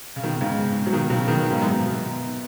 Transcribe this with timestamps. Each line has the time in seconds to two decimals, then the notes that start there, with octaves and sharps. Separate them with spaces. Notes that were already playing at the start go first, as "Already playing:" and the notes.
0.16 C#3
0.23 B2 D#3
0.41 G#2 C#3
0.87 F#3
0.93 B2 D#3
1.10 C#3 F#3
1.28 B2 D#3
1.50 G#2 C#3
1.62 F#2 B2
1.86 B2